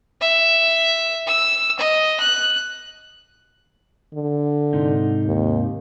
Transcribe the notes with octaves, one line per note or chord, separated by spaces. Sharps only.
E5
E6
D#5
F#6
D3
G#2 C3 D#4
D#2